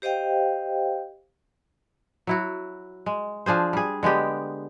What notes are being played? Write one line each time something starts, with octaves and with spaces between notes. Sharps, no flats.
G4 C5 D#5 F5 G5
F#3 E4 F#4
G#3
F3 D4 G#4 C5
G3 G#4
D3 G#3 B3 G4